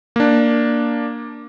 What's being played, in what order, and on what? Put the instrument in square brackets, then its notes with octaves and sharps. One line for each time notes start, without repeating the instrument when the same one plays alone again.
[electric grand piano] A#3 D4